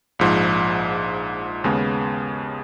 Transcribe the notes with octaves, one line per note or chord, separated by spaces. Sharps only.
A#1 G#2 F3
D#2 C#3 G#3 B3